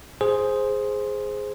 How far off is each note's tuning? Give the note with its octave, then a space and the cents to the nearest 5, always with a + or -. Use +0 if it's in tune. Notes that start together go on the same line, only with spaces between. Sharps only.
G#4 +0 C5 +0